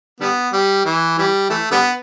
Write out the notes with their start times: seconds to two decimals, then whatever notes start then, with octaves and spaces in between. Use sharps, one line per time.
0.20 D3 G3 B3
0.53 G3
0.85 E3
1.18 E3 G3
1.50 E3 A3
1.71 D3 G3 B3